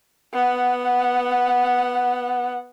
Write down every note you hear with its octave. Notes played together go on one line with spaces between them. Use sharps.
B3 F#5